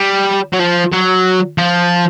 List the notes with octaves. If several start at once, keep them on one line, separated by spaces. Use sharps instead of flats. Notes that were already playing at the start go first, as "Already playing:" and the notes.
Already playing: G3
F#3
F3
F#3
F3